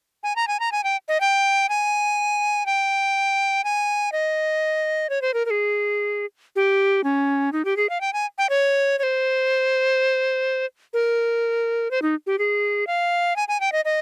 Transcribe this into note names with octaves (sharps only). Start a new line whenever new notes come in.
G#5
A#5
G#5
A#5
G#5
G5
D#5
G5
G#5
G5
G#5
D#5
C#5
C5
A#4
A#4
G#4
G4
C#4
D#4
G4
G#4
F5
G5
G#5
G5
C#5
C#5
C5
A#4
C5
D#4
G4
G#4
F5
G#5
G#5
G5
D#5
D#5